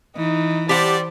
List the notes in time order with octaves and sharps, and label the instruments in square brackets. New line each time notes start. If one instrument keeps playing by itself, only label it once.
[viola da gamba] E3 [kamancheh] D#4
[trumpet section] G3 D5 A5 [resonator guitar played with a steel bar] G4 F#5 [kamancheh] C5